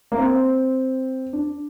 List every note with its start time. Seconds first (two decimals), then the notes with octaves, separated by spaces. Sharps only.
0.12 A#3
0.18 C4
1.33 D4